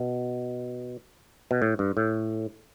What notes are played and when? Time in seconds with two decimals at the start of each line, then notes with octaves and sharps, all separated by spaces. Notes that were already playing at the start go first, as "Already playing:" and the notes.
Already playing: B2
1.51 B2
1.62 A2
1.79 G2
1.97 A2